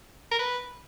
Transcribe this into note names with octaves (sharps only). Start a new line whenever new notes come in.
A#4
B4